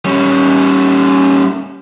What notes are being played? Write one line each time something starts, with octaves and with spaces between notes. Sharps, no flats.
G3 C#4